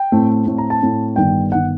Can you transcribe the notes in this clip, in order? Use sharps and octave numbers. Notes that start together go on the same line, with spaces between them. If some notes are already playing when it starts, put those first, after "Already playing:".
Already playing: G5
A2 A3 C4
A2 A3 C4
A#5
A5
A2 A3 C4
G1 G2 D#3 G5
G1 D#3 F#5